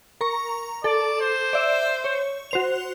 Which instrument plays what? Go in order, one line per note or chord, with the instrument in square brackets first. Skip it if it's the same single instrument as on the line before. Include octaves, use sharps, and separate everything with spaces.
[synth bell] A#4 A#5 C#6
[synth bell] A4 [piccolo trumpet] D5
[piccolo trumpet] C5
[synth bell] D5 E5
C#5
F#4 C5 F7